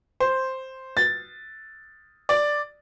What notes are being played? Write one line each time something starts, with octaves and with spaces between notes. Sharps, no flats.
C5
A6
D5